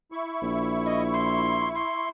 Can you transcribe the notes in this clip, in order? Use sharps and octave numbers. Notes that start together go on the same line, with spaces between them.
E4 C#6
A#1
D#5
C6
C6